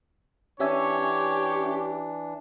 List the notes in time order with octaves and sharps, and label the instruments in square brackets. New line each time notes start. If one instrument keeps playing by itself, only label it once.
[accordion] E3 D4 [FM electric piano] C#4 E5 G#5 [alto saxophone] G4 [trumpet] C#5